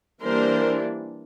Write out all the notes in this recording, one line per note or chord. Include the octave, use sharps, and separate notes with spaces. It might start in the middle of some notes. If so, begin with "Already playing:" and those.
E3 G3 A#3 D4 A#4 C5